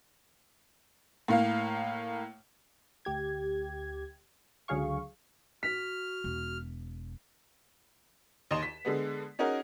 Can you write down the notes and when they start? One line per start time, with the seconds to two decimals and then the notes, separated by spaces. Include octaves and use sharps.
1.28 A2 A#3 F5
3.05 D2 G4 G#6
4.68 C#2 D3 F#3 G#4 F5 C#6
5.63 F#4 F6 B6
6.24 E1
8.51 D#2 D#5 C6 E7
8.63 B6
8.85 D3 G#3 B3
9.39 C#4 D#4 F#4 G#4 A#4